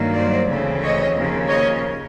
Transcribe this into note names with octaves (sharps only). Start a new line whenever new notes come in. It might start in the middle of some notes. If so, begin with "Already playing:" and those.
Already playing: G2 D#3 F#3 A#3
C5 D5
D2 C#3 E3 A3 C4
C#5 D#5
D#2 C#3 F3 A#3
C#5 D#5